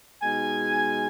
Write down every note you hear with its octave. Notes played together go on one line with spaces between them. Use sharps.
B2 G#3 D#4 G#5